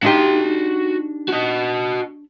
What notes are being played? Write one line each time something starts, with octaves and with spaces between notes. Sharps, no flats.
D4 D#4 F#4 G4 C6
F#4 D#5